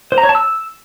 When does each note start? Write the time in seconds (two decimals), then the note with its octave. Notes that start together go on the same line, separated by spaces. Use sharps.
0.12 C5
0.18 A#5
0.23 C#5
0.29 A5
0.35 E6